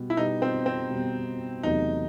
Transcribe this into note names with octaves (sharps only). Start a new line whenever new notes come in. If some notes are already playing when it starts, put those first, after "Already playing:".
Already playing: B2 G3 B3
E4
B2 G3 B3 D#4
C4
C4
B2 G3 B3
E2 C3 F#3 A3 D#4